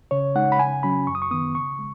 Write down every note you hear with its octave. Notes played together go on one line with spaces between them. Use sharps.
C#3 C#5
G#3 D#4 F#5
B5
C#3 G#5
F#3 C#4 B5
F#2 C#6
D#6
C#6
D#3 B3 D#6
C#3 C#6
G#3